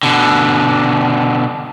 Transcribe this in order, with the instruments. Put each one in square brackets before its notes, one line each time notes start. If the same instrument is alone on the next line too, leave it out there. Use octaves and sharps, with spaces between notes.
[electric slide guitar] B2 D3